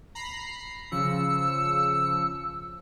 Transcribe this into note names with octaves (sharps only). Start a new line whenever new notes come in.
A#5 B5 C7
C#3 F3 E6 C#7